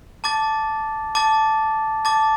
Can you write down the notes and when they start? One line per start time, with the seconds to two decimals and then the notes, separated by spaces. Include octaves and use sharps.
0.24 A5 D6 A6
1.15 A5 D6 A6
2.05 A5 D6 A6